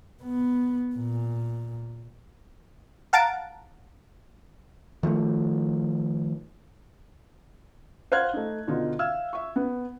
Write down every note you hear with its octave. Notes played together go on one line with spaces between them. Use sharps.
B3
A#2
F5 F#5 A5 A#5 A6 D7
D#3 F3 G3 A3
C5 F5 F#5 F6 F#6 G#6
A3 D#4
B2 D3 D#4 F4
E5 F5 E6 F6 G#6
E5 C#6
B3